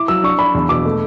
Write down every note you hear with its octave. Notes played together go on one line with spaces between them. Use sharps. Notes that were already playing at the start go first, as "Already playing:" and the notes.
Already playing: E4 D6
F#3 E6
D4 C#6
D4 B5
E2 B5
B2 D6
A3